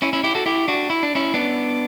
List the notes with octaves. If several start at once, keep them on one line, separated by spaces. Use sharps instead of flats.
C#4 E4
C#4 E4
E4 G4
F#4 A4
E4 G4
D4 F#4
E4
D4
C#4 E4
B3 D4